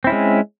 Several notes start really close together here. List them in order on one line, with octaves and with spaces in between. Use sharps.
C4 E4 C#4 G#3